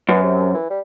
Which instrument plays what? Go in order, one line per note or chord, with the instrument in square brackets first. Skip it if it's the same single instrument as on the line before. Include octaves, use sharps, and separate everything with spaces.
[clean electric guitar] F#2 [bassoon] B3
[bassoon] C3
E3
G3